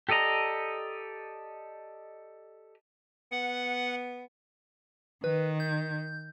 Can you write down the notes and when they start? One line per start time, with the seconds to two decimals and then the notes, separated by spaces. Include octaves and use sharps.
0.09 G4 A4 D5 D#5 A#5
3.32 B3 F#5
5.24 D#3 B4
5.60 G6